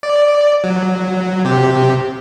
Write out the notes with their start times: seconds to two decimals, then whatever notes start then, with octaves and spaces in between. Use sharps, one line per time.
0.03 D5
0.64 F#3
1.45 C3 G4